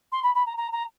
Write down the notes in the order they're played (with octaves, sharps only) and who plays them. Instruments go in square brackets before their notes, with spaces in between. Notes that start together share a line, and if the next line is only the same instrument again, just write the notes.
[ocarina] C6
B5
B5
A#5
A#5
A#5